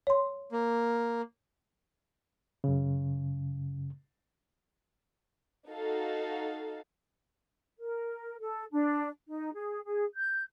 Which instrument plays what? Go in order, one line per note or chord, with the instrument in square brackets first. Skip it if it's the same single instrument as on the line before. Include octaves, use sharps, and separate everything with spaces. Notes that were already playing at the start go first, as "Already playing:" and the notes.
[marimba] C#5 C6
[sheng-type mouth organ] A#3
[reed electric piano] F#2 C#3
[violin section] D#4 F#4 A4 F5
[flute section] A#4
A4
D4
D#4
G#4
G#4
G6